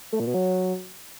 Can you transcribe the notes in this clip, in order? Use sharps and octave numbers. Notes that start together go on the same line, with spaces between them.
A3
A#2
B2
F#3